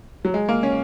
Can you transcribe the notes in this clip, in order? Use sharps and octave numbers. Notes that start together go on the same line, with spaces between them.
F#3
G#3
A#3
C#4